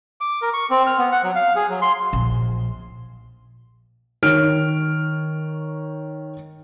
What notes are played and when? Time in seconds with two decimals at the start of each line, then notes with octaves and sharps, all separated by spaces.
0.21 D6
0.42 A#4
0.54 C#6
0.70 C4
0.87 F6
0.98 B3
1.12 F#5
1.23 F#3
1.35 F5
1.56 G#4
1.69 F#3
1.82 C6
2.13 A#1
4.23 D#3 C#5 F6 D7